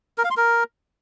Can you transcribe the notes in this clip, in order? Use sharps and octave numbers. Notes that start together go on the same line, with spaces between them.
A#4
F5
C6
A#4